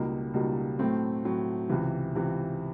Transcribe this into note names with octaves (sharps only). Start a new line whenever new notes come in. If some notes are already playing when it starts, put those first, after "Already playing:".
Already playing: C#2 B2 G3 A#3 D#4
C#2 B2 G3 A#3 D#4
A2 F#3 A3 C4
A2 F#3 A3 C4
C#2 C3 E3
C#2 C3 E3